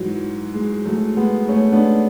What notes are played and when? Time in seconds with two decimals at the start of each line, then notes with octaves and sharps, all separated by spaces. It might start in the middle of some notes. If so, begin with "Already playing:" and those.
Already playing: G#2 E3 F#3
0.54 G#3
0.86 F#3 A3
1.17 G#3 B3
1.49 A3 C#4
1.72 B3 D4